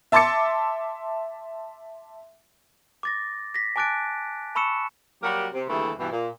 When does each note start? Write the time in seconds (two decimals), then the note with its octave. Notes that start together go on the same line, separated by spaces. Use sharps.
0.12 E5 A5 C6 D6 A6 C#7
3.03 D6 A6 A#6
3.54 A#6 B6
3.76 G#5 A5 D6 F#6 A6 D7
4.55 A5 B5 C#6 E6 C#7 E7
5.23 F#3 G3 A#3 F#4 G4 A#4
5.53 C3
5.68 D#2 D3 E3 G3 A3 G#4
5.99 G2 B2 E3
6.11 A#2